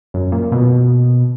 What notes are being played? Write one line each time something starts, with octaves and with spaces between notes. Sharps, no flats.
F#2
A#2
B2